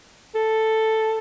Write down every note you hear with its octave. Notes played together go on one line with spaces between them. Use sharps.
A4